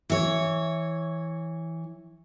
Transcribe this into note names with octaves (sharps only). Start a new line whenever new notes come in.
E3 C#5